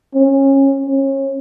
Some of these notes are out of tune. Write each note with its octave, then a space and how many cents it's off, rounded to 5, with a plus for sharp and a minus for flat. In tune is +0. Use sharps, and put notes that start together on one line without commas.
C#4 -25
C#4 -30